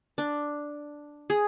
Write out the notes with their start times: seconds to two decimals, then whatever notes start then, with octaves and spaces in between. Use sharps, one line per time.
0.18 D4
1.30 G#4